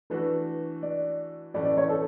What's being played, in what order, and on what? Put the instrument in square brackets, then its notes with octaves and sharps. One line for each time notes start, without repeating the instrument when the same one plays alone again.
[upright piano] E3 A3 D4 F#4 [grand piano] B4
[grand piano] D5
[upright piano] A2 E3 A3 C#4 [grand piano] D5
[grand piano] D5
C#5
A4